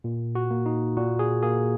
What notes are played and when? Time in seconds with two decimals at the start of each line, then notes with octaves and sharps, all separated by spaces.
0.04 A#2
0.35 F#4
0.51 A#3
0.66 D#4
0.97 A#2 F#4
1.19 G#4
1.43 A#3 G#4